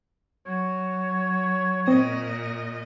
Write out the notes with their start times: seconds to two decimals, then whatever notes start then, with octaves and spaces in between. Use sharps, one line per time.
0.46 F#3 C#5
1.87 A#2 C4 D#5